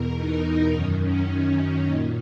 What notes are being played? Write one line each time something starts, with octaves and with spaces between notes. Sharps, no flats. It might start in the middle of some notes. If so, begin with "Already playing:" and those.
Already playing: E2 B2 A#4
D#4
F#2 D#3 C#4
C#4
A#2 D#4